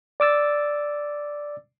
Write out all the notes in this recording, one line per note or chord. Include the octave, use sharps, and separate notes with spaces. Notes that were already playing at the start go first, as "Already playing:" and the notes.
D5 D6 E6 A6